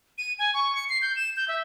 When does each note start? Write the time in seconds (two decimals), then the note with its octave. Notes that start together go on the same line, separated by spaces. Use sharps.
0.18 D#7
0.39 G#5
0.54 C#6
0.75 C#7
0.89 C7
1.02 G6
1.16 E7
1.37 G6
1.48 E5